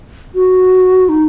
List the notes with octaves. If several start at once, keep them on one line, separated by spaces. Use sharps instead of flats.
F#4
D#4